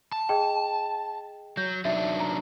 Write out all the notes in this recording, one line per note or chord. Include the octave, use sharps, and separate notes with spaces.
A5
G#4 D#5 G5
F#3 G6
F#3 D4 D#4 E5
A#5